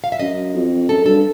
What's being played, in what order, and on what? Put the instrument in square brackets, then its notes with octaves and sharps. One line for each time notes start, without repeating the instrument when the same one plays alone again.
[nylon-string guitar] F5
E5
[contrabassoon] F#2 [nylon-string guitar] D#5
[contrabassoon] F2
[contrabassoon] F#2 [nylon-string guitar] A4
[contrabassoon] G2 [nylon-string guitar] A4